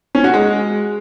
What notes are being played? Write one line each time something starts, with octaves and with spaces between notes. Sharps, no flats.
C#4
F#4
G#3